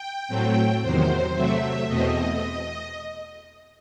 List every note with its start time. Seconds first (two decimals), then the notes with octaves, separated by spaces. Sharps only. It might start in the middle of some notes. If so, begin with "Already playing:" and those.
Already playing: G5
0.28 A2 F#3 A3 C4
0.81 E2 C3 D#3 F#3 C5
1.34 C3 F#3 A3 E5
1.87 E2 B2 A3 C4 D#5